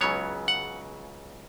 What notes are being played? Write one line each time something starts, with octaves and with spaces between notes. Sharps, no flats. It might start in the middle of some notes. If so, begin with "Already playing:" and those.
C#2 C#3 F#3 B3 C#5
F#5